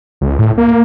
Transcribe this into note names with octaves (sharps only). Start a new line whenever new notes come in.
C#2
A2
A#3